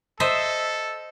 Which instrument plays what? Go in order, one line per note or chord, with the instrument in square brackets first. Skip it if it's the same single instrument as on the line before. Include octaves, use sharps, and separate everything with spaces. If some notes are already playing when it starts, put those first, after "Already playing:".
[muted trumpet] A4 [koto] C5 D#5 E5